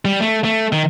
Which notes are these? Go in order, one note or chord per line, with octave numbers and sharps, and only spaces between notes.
G3
A3
A3
D#3